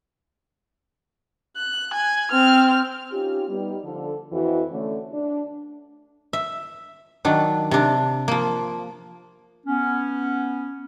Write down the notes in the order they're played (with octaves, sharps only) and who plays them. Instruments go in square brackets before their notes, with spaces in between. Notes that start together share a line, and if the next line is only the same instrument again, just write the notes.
[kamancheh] F#6
G#5
C4 F6
[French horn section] C#4 D#4 F4 G4
G3 B3 D#4
D3 F3 A4
F2 E3 F#4
D3 A3 C#4
D4
[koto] E5
D#3 F#3 D4
C3 D4
F3 A#3
[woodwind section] B3 C#4